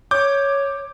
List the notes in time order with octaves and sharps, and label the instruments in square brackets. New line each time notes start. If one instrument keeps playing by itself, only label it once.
[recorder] C#5 [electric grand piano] D6 G6